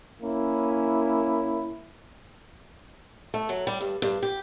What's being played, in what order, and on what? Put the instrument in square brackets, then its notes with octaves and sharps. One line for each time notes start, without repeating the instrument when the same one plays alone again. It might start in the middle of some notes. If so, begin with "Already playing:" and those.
[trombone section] A#3 C#4 E4
[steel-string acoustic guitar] A3
F#3
G3
G2
G2
G4